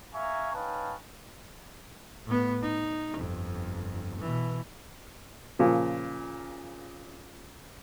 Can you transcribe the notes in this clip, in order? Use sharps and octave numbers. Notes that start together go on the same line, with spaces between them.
A#3 E5 F5 G#5 A#5 C#6
C#4 D#4 B4 F5 G5 A5
A2 B3
D#4
G1 F2
B2 E3
A#2 C#3 F3